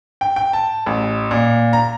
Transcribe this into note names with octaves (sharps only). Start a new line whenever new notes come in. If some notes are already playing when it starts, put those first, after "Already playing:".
G5
G5
A5
A1
A#2
A#5